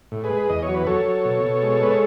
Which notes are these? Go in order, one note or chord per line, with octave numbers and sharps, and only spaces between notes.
A2
G#4 B4
G#3
E2 D#5
C#5
F#3
B4
F#3 A4 C#5
F#3
B2
B2
G#3
G#3 B4
C#5